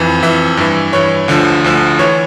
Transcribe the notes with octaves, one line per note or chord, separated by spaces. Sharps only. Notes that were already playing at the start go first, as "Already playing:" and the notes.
Already playing: F2 E3
F2 E3 E5
G2 E3
G2 E3 C#5
D2 D3 F3
D2 D3 F3
E3 C#5